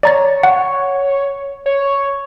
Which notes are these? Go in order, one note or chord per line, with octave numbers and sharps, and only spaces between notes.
C#5 D5 A#5 A6
F#5
C#5